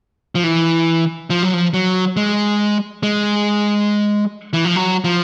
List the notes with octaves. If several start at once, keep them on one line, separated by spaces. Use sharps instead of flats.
F3
E3
F3
F#3
F3
F#3
G#3
G#3
E3
F3
F#3
F3